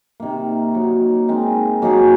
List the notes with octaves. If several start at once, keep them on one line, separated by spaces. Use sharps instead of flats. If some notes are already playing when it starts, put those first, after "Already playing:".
C3 D#3 A#3
F#3 A#3 D#4
G#3 C4 D#4 A#4
F#3 A#3 D#4 G#4